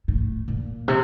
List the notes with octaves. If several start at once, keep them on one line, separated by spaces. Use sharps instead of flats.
A2
A#2
C3